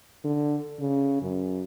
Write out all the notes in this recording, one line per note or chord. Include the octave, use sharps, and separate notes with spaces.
D3
C#3
F#2